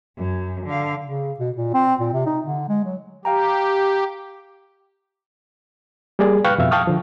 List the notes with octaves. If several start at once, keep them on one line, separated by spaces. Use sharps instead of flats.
F#2
D3 F5
C#3
B2
A#2
C4
A#2
C3
D#4
D3
G#3
F#3
G4 F5 G5 A#5
G3 A#3 G#4 D5
B4 F5 G5 C#6 F6 F#6
F2 B2 E5 F5
F5 G5 A5 C#6 D#6 F6
D3 F3